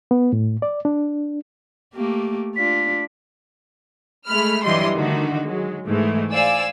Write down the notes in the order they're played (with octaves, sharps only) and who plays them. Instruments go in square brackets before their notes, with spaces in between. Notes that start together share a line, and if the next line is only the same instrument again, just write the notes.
[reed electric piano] B3
A2
D5
D4
[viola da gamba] A3 A#3 G4
[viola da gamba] D4 F4 [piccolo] B6
[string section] G#3 A3 B5 F6
G2 E3 F#3 G3 D#5 C6
D3 D#3 A3 D#4 F#4
F#3 G#3
G#2 E3 G#3 A3
C5 D5 F5 G#5 E6